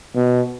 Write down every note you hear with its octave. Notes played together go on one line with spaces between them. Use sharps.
B2